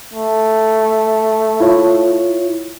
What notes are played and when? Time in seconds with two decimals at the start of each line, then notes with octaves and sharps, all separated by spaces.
0.14 A3
1.60 E4 F4 C#5